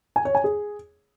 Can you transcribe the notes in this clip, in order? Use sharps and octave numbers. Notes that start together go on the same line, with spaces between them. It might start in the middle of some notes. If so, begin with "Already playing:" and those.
G#5
C#5
G#5
G#4